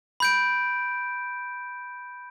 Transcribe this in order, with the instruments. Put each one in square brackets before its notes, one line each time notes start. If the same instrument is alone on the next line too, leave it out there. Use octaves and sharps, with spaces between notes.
[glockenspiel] B5 G6 D7